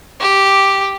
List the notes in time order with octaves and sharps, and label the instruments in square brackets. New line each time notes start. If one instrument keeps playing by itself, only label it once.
[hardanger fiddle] G4